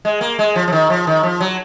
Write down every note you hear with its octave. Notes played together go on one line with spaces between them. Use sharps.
G#3
A#3
G#3
F3
F3
D#3
F3
D#3
F3
F#3